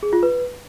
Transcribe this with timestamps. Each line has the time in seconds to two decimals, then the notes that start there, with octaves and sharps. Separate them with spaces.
0.03 G#4
0.13 F4
0.23 B4